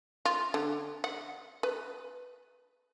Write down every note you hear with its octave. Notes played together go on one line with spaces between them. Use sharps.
F4
D3
F#5
B4